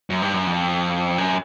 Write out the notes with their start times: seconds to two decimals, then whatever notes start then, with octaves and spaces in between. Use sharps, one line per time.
0.10 F#2
0.22 G2
0.34 F#2
0.47 F2
1.18 F#2